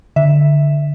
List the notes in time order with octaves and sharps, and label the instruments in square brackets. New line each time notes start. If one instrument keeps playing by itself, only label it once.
[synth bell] D3 E5